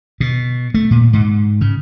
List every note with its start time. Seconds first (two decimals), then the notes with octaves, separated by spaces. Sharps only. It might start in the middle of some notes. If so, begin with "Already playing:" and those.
0.20 B2
0.74 A3
0.91 A#2
1.13 G#2
1.61 C#3